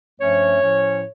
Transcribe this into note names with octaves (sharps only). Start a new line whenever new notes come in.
G2 F3 A3 C#4 C#5
A2 F3 C#4